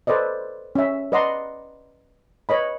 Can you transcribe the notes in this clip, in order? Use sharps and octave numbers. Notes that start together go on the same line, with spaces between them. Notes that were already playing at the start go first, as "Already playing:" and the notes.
A4 B4 C5 D5 D#5
C#4 E5
B4 D5 D#5 F#5 A#5 C6
B4 C#5 D#5 B5